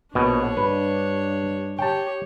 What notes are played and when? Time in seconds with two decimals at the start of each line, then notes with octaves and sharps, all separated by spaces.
0.15 A#1 B2 D4 C#5
0.57 G2 B4
1.79 G4 C#5 G5 A5